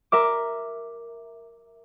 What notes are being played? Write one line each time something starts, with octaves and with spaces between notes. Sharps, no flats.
A#4 E5 D6